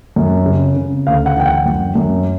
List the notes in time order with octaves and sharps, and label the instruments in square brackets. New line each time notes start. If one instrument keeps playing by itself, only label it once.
[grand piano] F#2
C#3
C#3
D2 F5
F#5
E3 G5
F#5
F#2
F#2